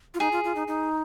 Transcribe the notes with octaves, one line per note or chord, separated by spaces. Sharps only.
F4
D#4 G#4
F4
F4
D#4
D#4